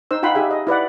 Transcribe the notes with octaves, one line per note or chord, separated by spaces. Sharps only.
D#4 C5 E6
D#4 F4 F#5 G5 B5 C6
D#4 G4 G#4 E5 G#5
D#5
E4 B4 D5 F#5